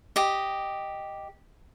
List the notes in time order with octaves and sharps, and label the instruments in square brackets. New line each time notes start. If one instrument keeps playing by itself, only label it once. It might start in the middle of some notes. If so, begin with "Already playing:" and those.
[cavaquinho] G4 D#5